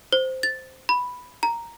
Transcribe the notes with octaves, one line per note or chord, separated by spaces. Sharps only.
C5
A6
B5
A#5